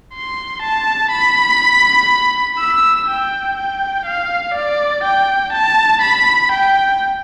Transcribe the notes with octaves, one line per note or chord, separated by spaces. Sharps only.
C6
A5
B5
E6
G5
G5
F5
D5
G5
A5
B5
G5